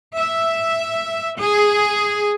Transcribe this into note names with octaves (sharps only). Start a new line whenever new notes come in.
E5
G#4